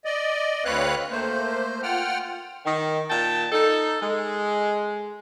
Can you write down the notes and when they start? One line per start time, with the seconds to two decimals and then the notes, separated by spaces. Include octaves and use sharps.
0.05 D5 D#5
0.65 D2 C4 B4 C#5 F5 F#6
1.12 A3 A#3 C5
1.83 F4 F#5 G5 F6
2.65 D#3
3.09 A#2 G5 A5
3.52 D#4 A4
4.00 G#3